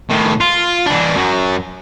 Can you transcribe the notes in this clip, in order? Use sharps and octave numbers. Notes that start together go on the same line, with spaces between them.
A2 D#3
F4
E3 D4
F#2 F#3